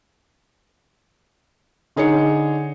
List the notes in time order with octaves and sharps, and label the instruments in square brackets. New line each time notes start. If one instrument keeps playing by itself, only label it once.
[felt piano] D3 D#4 G#4 C#5 C#7